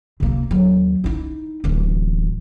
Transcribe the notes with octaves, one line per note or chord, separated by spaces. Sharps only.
C3 A#3
D#2 F#3
D#4 E4
D1 E3